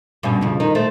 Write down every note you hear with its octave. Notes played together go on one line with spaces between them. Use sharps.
G2 B2 C#4
F2 C#3
D#3 D#4
A3 C4